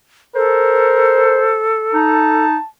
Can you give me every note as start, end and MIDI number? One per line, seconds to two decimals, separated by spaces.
0.35 2.45 69
0.35 1.42 70
0.35 1.67 72
1.94 2.56 63
1.94 2.68 81